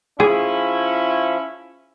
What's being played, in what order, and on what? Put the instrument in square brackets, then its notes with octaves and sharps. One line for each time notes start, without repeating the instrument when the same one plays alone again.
[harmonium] F3 [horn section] C#4 E4 [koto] G#4